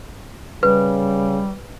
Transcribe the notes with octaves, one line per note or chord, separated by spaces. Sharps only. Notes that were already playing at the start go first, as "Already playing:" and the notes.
C#3 G3 B4